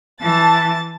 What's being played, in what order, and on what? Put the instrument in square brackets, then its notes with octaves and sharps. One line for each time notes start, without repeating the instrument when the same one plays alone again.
[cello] E3 [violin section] A5 A6